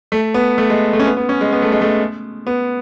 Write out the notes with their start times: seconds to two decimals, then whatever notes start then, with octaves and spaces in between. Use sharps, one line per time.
0.12 A3
0.34 B3
0.58 A3
0.70 G#3
0.93 A3
0.99 C#4
1.06 B3
1.17 B3
1.29 C#4
1.41 G#3
1.52 B3
1.62 A3
1.72 G#3
1.81 A3
2.47 B3